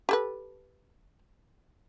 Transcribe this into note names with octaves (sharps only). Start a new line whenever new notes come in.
G4 A4 B4